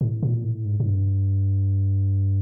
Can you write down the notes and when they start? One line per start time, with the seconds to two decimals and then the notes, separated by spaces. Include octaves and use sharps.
0.01 A2
0.23 A#2
0.44 A2
0.65 G#2
0.80 G#2
0.87 G2